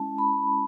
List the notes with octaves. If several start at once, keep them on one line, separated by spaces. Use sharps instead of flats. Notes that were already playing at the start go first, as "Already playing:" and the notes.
Already playing: G#3 C#4 E4 A5
B5